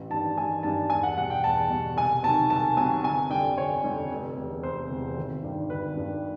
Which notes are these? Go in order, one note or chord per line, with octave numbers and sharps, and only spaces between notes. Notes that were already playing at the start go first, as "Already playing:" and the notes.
Already playing: A1
G2 D#3 G3 A5
A1 G#5
G2 D#3 G3 A5
E2 G#5
F#5
B2 G3 F#5
G5
E2 A5
B2 G3
C2 G#5
C3 D#3 F#3 A5
C2 A5
C3 D#3 F#3 G#5
G1 G#5
F2 D3 G3 G5
G1 C#5
F2 D3 G3
F1
E2 C3
F1 C5
E2 C3
G#1
G2 D#3 G3
G#1 B4
G2 D#3 G3